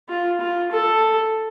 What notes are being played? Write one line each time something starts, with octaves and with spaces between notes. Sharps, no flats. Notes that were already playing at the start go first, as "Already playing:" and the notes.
F4
F4
A4